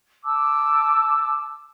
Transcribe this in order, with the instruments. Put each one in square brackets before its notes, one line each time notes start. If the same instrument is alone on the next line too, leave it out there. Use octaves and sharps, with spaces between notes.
[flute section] A5 D6 E6